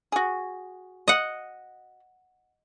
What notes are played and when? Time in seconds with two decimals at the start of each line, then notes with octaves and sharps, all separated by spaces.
0.12 F#4 G#4
1.08 D#5 F#5